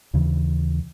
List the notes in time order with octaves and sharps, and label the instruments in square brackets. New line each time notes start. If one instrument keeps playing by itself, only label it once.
[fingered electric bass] D#2 C#3 E3